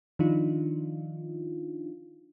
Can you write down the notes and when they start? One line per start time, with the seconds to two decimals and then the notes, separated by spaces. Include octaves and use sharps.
0.19 D#3 F3 D4 D#4 F4